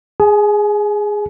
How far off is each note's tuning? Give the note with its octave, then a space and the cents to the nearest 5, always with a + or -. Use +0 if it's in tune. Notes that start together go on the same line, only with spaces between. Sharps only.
G#4 -5 G#5 +35